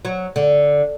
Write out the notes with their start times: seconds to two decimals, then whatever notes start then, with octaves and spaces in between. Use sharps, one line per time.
0.05 F#3
0.36 D3